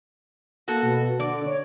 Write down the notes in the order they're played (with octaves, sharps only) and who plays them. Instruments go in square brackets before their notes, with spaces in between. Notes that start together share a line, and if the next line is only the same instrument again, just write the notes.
[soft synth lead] A#3 [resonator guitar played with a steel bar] F#4 A4
[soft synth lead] B2
[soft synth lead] D3 [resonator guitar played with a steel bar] D5
[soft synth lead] C#5